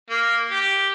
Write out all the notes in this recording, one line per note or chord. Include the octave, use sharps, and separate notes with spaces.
A#3
G4